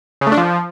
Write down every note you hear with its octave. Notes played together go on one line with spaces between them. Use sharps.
C#3
A3
D4
F3